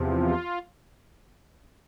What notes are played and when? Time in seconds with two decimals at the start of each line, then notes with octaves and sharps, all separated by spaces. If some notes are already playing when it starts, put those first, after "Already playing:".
Already playing: E2 C3 F3
0.15 F4